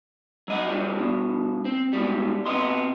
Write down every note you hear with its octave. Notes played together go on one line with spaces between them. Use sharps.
F#3 D#5 F#5
G2 C#3 F3 G3
G2 B2
C4
G#2 B2 G3
C3 B3 D#5 C6